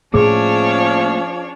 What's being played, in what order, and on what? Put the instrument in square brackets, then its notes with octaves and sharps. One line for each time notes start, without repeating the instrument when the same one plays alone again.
[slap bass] A2 A3 A#3 [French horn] F3 [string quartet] C#4 D4 C#5 [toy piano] G#4